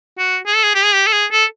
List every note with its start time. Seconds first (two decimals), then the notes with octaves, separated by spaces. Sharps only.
0.18 F#4
0.46 G#4
0.55 A4
0.64 G#4
0.75 G4
0.84 G#4
0.94 G4
1.07 A4
1.13 G#4
1.32 A4